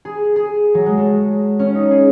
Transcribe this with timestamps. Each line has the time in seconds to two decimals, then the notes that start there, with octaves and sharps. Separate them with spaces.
0.05 G#4
0.36 G#4
0.74 F#3
0.86 G#3
0.97 A3
1.59 C#4
1.75 D#4
1.91 G#4